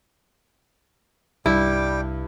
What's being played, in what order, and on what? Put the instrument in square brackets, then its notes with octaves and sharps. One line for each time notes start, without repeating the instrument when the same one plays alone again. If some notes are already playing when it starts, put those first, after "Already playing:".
[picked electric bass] C2 [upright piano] G2 [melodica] G3 G5 D6 [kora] E4